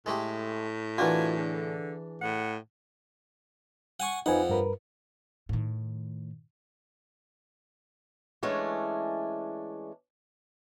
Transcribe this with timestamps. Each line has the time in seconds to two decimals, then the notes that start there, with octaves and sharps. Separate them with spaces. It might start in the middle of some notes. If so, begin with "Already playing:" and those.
0.06 A2 G#3 A3 G4
0.98 E3 D4 F4 F#4 A#4 G#5
1.37 D3 G#4
2.22 A2 F#5
4.00 F#5 G#5 C#6
4.26 F2 D#4 B4 F#5 G#5
4.50 G2 A#4 B4
5.49 A2 D#3
8.43 E3 G#3 A3 C#4 D4